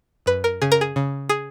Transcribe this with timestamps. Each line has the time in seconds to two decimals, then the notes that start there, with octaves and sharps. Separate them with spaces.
0.26 F#2 B4
0.44 A#4
0.62 C#3 G#4
0.72 A#4
0.81 G#4
0.96 C#3
1.29 G#4